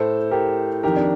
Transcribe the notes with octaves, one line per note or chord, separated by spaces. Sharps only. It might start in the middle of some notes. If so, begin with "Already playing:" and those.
Already playing: A2 A4 C5
G4 A#4
F2 D#3 G4 A#4
D4